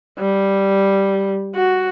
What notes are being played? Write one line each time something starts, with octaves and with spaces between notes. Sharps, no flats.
G3
F#4